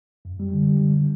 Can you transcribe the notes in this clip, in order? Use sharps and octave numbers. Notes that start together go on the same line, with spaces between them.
F#2
G3
D3
G3
D3